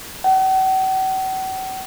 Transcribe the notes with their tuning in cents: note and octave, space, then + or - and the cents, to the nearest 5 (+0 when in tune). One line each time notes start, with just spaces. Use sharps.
F#5 +45